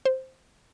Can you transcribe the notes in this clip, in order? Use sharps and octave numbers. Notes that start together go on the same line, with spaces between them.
C5